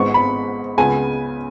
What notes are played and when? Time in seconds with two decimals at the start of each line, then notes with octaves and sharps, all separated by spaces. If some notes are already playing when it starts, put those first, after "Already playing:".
Already playing: G#1 G#2 G#3 B3 C#6
0.14 B5
0.78 C#2 C#3 B3 G#5